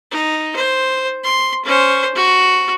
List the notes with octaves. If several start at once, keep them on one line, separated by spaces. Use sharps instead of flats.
D#4
C5
C6
C#4 C5
F#4